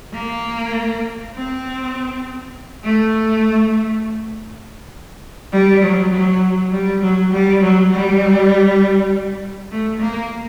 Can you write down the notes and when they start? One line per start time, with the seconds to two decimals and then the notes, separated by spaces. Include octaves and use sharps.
0.14 A#3
1.34 C4
2.84 A3
5.52 G3
5.83 F#3
6.12 F#3
6.72 G3
7.02 F#3
7.32 G3
7.61 F#3
7.92 G3
9.71 A3
10.01 A#3